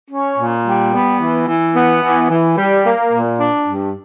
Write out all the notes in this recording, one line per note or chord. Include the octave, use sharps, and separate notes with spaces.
C#4
A#2
G3
B3
E3
E3
B3
E3
E3
G3
A#3
A#2
D4
G2